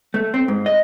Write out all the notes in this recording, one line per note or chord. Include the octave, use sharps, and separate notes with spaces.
A3
C4
G#2
D#5